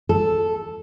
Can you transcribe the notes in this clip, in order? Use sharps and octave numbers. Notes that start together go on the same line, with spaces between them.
A4